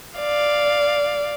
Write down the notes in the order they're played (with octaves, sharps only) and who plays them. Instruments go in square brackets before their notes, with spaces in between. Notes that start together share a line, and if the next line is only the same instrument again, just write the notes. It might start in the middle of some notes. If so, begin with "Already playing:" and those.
[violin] D5 F5